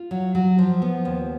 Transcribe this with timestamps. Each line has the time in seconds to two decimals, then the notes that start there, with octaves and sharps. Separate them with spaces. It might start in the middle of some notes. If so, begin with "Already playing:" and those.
Already playing: F4
0.11 F#3
0.35 F#3
0.58 F3
0.82 B3
1.05 D#2